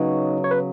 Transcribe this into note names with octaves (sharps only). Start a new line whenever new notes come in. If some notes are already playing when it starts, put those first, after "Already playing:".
Already playing: C#3 F#3 B3 D#4 D#5
C#5
B4